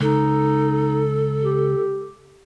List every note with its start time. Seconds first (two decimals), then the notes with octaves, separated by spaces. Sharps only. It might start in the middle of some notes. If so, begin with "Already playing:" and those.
0.01 C#2 D#4 A4
1.41 G4